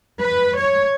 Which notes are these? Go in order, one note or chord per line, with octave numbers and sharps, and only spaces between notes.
B4
C#5